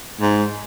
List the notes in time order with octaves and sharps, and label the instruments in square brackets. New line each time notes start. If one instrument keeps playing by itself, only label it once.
[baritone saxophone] G#2